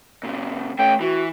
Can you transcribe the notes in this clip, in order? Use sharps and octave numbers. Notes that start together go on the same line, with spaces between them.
A#2 C#3
A3 C#4 G5
E3 F#4